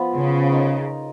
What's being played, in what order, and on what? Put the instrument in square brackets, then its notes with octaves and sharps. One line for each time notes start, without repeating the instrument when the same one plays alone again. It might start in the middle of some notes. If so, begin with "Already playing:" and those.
Already playing: [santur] F3 B3 F4
[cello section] C#3
[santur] D#4 A#4 D#5